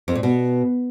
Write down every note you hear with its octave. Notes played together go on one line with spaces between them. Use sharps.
F2
A#2
B2